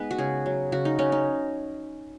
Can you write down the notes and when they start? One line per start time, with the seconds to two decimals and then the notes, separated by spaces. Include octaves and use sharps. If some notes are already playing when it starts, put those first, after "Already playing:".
Already playing: G#3 B3 D#4 B4
0.11 F#4
0.19 C#3 G#4
0.46 F#3
0.72 C#3 F#4
0.85 D#4
0.99 C#3 C#4
1.12 D#4